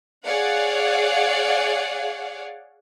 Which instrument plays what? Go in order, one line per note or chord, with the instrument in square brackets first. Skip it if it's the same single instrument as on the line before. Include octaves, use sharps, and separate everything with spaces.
[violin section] G#4 C#5 D5 F5 F#5